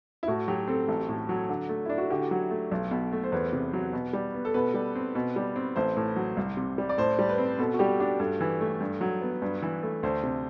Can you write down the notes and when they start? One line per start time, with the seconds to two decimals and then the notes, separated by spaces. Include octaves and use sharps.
0.23 E4
0.28 A2 F#4
0.48 F#3 G4
0.67 C4 A4
0.88 A1
1.09 A2
1.29 F#3
1.49 D3
1.69 A3
1.85 D4 E4
1.98 F#4
2.10 D3 G4
2.31 F#3
2.51 A3
2.72 B1
2.91 B2
3.12 A3
3.24 C5
3.32 E2 B4
3.53 C3
3.73 F#3
3.93 B2
4.13 G3
4.34 B3
4.45 A4
4.54 B2 B4
4.74 G3
4.95 C4
5.15 B2
5.36 G3
5.56 C4
5.76 A1 C5
5.97 A2
6.16 F#3
6.37 C2
6.57 C3
6.78 G3
6.89 D5
6.98 A2 C5
7.19 G3
7.29 B4
7.38 C4
7.59 B2 A4
7.74 F#4
7.79 G3 G4
8.00 D4 G4
8.19 G2 A4
8.41 E3
8.61 A3
8.80 G2
9.01 F#3
9.22 B3
9.42 G2 B4
9.62 E3
9.83 A3
10.03 D2 C5
10.23 C3